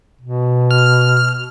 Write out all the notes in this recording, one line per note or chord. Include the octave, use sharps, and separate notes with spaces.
B2
F6